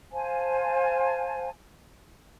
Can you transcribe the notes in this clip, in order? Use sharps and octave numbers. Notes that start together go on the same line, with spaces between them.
C5 F5 G#5 A5